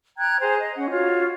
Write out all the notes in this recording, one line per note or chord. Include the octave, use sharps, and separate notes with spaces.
G5 A#5 F#6 G#6
G#4 C5 G#5 A#5
D#5
C#4 F#5
F4 F#4 C#5